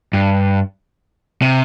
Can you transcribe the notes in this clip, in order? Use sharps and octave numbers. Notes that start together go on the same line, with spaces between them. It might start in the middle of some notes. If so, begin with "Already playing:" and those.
G2
C3